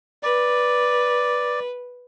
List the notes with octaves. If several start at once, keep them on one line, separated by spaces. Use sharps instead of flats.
B4 D5